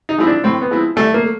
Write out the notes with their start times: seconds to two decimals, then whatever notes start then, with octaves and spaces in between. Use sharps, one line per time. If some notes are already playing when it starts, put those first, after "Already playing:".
0.09 D#4
0.18 F3 G#3 C4 E4
0.27 D4
0.44 A2 C4
0.61 B3
0.71 F3 G#3 C4 E4
0.96 C2 A3
1.14 A#3
1.23 A3